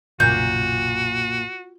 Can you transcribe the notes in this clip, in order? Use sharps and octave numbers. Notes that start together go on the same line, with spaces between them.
B1 F#2 A#2 C#3 F#4 G6